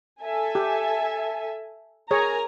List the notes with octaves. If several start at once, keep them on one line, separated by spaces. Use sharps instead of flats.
A4 E5 G#5
G4
G#4 A#4 C#5 G#5 A#5